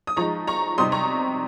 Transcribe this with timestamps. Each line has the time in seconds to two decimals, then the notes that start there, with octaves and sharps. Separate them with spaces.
0.07 D#6
0.17 F3 G#3 D#4 A#5 C#6
0.47 A#5 C#6
0.78 C3 G3 C4 D#4 C6 D#6
0.92 A#5 C#6